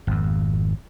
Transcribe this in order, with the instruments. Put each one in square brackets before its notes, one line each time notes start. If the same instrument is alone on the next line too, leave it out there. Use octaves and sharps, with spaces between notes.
[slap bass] G#1 F2